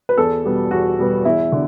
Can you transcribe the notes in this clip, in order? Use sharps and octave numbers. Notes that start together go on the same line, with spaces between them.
B4
E2 A4
B2 G3 B3
E2 F#4
B2 G3 B3
E2 E4
D3